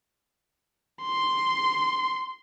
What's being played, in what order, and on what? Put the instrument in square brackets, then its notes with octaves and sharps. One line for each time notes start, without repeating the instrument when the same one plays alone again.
[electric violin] C6